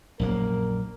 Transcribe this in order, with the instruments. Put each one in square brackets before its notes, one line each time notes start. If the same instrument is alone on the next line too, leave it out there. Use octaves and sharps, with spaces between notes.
[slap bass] A#1 F#2 A#3 [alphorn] A#4